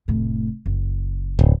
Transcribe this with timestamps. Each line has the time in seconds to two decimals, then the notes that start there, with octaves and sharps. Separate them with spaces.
0.08 F1 A2
0.66 F#1
1.39 D1